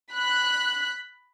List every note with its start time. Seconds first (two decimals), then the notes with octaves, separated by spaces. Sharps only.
0.12 B5 F#6